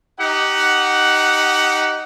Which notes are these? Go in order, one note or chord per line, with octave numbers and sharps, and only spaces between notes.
D#4 G4 F#5